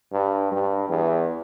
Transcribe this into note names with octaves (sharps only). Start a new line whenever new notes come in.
G2
G2
E2